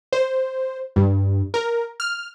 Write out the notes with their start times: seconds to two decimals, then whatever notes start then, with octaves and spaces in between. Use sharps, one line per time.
0.13 C5
0.96 G2
1.54 A#4
2.00 F6